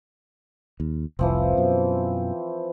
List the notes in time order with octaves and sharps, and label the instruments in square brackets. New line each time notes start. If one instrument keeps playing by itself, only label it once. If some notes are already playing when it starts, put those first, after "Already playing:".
[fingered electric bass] D#2
[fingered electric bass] F1 C2 [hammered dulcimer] E3 F3 C4
[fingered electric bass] F#2 B2